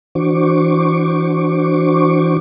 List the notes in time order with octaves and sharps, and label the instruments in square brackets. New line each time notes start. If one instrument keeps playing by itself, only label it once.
[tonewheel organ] E3 D4 F#4 C5 C#6 D6